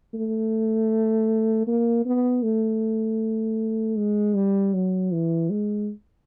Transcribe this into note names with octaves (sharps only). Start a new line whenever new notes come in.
A3
A#3
B3
A3
G#3
G3
F#3
E3
G#3